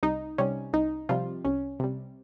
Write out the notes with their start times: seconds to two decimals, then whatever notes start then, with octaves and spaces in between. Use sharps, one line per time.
0.03 C2 D#4
0.38 C3 G3 C#4
0.73 C2 D#4
1.09 C3 F3 G3 F4
1.45 C2 C#4
1.80 C3 G3